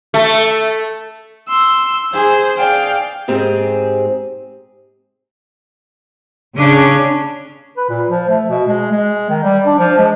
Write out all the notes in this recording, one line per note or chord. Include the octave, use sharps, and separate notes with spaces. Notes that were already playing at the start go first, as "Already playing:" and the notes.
A3
C6 E6
G#4 C5
G#4 D5 F5 G5
G#2 C4 G4 G#4
C#3 C#4 D4
B4
A#2
F3
A3
B2
G#3
G#3
D#3
G3
D4
F3
G#3